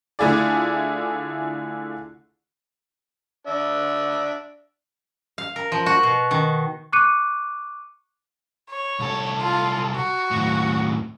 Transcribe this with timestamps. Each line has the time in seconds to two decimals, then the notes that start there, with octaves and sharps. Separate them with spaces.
0.19 D3 A3 E4 F4 G#4 D5
3.47 D4 E5
5.38 F5
5.56 A#4
5.72 F3
5.86 F#4
6.03 B2
6.31 D#3
6.92 C#6 D6 F#6 C#7 D#7
8.70 C#5
8.99 C2 A4
9.41 F4
9.96 F#4
10.31 D#2 A2